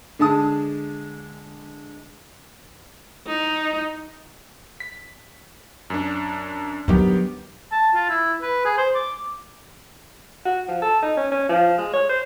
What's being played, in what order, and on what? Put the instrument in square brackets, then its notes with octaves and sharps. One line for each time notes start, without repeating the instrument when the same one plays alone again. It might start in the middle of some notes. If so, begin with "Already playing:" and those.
[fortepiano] D3 G#3 A5 D#6
[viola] D#4
[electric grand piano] B6
F#2 D4
[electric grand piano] D#3 B3 G4 [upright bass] F#3 D4
[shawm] A5
F4
E4
B4
G#4
C5
D6
[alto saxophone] F#4
F3
A4
D#4
C#4
C#4
F3
G#3
C#5
C5